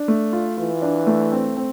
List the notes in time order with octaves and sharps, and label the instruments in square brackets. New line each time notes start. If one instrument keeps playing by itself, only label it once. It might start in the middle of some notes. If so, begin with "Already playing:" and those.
Already playing: [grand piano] D4
A3
F4
[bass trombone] E3 [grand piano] F4
[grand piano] D4
A3
C4
C4